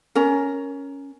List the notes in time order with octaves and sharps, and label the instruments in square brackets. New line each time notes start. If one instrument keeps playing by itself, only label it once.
[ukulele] C#4 A#4